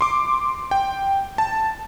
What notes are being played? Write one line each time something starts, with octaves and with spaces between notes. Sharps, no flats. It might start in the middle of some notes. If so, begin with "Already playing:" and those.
C6 D6
G5
A5